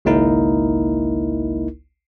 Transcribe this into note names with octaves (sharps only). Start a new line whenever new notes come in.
G#1 C#2 A#3 D#4 E4 A#4